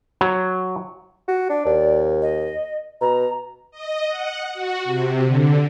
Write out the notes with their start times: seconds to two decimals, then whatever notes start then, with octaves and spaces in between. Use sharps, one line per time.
0.21 F#3
1.28 F#4
1.49 D4 D5
1.65 D#2
2.22 D#5
3.01 B2 A#5
3.72 D#5
4.09 F#5
4.54 F#4
4.84 C3
5.25 D3